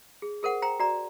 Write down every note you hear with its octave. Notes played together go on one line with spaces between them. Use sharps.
G#4
G#4 A#4 C5 F#5
C5 G5 A#5
F#4 D5 A#5